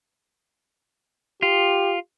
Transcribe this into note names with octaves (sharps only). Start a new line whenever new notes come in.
F4 G4